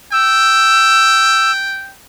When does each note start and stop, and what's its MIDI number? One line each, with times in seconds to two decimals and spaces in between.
0.12 1.92 79
0.12 1.51 88